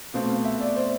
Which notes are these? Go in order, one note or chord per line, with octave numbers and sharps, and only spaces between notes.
B2 A3 C4 F5
F5
E5
D5
C5